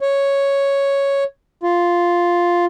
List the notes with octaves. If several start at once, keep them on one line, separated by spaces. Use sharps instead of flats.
C#5
F4